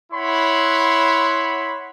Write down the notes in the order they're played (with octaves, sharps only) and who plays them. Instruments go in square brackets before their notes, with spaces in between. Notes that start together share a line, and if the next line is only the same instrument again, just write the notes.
[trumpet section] E4 C#5 F#5 B5 C6